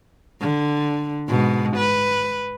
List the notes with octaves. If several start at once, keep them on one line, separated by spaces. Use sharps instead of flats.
D3
G#2 B2
B4